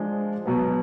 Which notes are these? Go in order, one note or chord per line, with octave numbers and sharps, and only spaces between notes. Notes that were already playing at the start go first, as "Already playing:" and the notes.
Already playing: F3 G#3 D4 F4
B2 F#3 B3